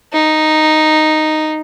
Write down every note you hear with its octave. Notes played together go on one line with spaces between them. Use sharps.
D#4